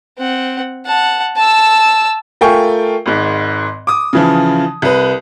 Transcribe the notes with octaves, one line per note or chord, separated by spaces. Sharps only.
C4 F#5
F#5 A5
A5 E6
A3 F4 A#4 G5 G#5 C#6
G#1 G#2
D6 D#6
C#3 E3 F3
C2 B4